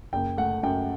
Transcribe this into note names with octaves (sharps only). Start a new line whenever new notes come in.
F#1 G5
A3 F#5
F#2 G5